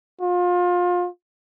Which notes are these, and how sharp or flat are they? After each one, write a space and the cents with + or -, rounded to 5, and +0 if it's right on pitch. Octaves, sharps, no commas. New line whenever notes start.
F4 +30